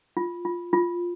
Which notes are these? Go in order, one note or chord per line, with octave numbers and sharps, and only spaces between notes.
F4
F4
F4